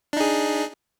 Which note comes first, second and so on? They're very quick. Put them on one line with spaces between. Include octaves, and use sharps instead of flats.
D4 D#4 G#4